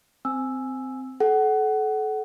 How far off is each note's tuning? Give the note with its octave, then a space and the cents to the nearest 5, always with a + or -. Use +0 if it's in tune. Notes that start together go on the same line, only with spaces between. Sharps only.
C4 -15 G#5 +0 E6 +0
A4 -30 F#5 +20